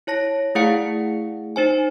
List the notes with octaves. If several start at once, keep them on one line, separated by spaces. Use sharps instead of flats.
E4 C#5 A5 A#6
A3 E4 G#4 F5 F#5 C#7
D#4 C5 G#5